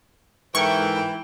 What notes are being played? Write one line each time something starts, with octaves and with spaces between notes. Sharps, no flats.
G#2 E3 E4 A4 A#4 G5 C#6